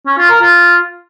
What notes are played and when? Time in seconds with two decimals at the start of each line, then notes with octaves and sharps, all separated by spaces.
0.07 C#4
0.18 F4
0.30 A#4
0.41 F4